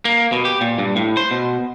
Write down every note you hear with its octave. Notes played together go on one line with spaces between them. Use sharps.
A#3
B2
G4
A#2
G2
A2
C5
B2